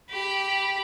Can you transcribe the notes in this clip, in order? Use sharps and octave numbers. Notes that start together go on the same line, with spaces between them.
G4 B5